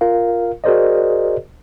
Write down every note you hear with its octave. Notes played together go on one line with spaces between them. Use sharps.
F4 A#4 F5
F#4 G#4 A#4 C5 D5 D#5